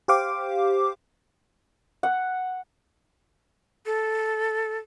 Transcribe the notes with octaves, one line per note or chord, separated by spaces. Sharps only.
G4 C5 F5 D6
F#5
A4